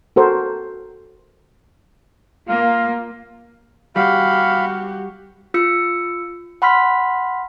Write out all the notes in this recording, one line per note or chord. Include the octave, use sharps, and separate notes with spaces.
F#4 A4 A#4 C5
A#3 F4
G3 F#4 G4 F5 B5
F4 E6 C#7
F#5 B5 C6 F6 B6